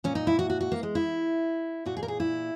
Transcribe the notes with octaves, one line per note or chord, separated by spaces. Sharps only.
A#2 C#4
D#4
E4
F#4
F#4
F#4
A#3
G#3
E4
A#2 F#4
G#4
A#4
G#4
E4